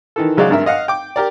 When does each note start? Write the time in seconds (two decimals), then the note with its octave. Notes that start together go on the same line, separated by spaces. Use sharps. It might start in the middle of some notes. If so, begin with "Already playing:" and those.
0.16 D#3 E3 A4
0.37 C#3 F#3 G#3 D5 F5
0.50 G#1 G2 A#4 E5
0.66 D#5 F5 F#5
0.88 G5 D6
1.16 G4 A#4 D5